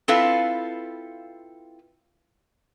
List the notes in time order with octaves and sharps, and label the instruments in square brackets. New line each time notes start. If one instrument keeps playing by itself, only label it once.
[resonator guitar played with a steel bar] C4 E4 F4 A4 B4 F5